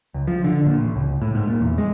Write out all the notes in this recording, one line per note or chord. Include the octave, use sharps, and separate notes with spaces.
C#2
F3
D3
A#2
A1
C#2
A2
G#2
A#2
E2
G#3